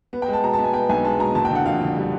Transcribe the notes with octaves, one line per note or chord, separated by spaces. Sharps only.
B3
G5
G#3
A5
B2 A#5
A5
B3
G#5
B3 G5
B1 G#5
G#3 A5
B2 A#5
F#1 A5
G5
D3 F#5
F2 F5
D3
G3